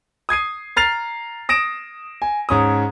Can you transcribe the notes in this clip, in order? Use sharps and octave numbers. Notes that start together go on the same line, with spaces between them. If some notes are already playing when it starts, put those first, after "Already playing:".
D#6 G#6 C7 D#7
A#5 F6 A6 C7 F7
D#6 A#6 D7 E7
G#5
G#2 C#4 D#6